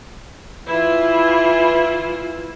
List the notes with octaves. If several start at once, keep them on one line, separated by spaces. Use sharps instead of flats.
E3 E4 F4